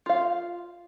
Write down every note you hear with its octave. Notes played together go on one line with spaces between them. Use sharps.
F4 F5